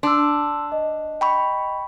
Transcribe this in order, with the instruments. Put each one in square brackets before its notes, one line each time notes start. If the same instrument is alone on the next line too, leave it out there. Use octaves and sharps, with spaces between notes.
[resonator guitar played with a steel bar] D4 [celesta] C6 D6 E6
[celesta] D#5
[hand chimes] G5 B5 C#6